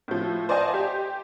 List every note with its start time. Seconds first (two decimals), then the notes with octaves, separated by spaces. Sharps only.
0.08 A2 F3
0.49 C5 D5 D#5 F5 G#5 A5
0.74 G4